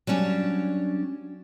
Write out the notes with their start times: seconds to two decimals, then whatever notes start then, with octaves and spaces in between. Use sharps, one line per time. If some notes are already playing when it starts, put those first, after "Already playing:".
0.07 F#3 G3 C#4 D4